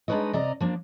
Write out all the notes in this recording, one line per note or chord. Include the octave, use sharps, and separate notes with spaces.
G#3 D4 D#4 B4 C#5 D#5
C3 D5 D#5 A#5
F3 A#3 D4